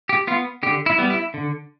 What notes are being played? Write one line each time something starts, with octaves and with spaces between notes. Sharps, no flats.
G4
B3 F4
D3 G4
E4
G3 B3
E4
D3